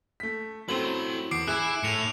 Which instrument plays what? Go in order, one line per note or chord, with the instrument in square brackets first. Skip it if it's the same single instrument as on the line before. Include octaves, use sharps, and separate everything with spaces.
[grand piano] A3 B6
[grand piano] F#3 A3 C4 [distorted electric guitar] E4 C6 [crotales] F#7
[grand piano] E2 [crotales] D6 C7 D7
[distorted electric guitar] E4 [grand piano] G#4 [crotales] F#6
[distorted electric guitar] A2 [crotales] C#7 F7